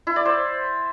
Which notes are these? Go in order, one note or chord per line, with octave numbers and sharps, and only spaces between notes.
E4
D5
C5